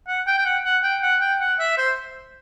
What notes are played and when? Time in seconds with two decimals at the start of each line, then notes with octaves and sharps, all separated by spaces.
0.08 F#5
0.27 G5
0.38 G5
0.45 F#5
0.65 F#5
0.83 G5
1.02 F#5
1.21 G5
1.41 F#5
1.60 E5
1.78 C5